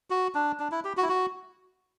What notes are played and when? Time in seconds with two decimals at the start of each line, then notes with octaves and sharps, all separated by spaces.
0.10 F#4
0.35 D4
0.59 D4
0.71 E4
0.84 G4
0.97 F#4
1.03 E4
1.09 F#4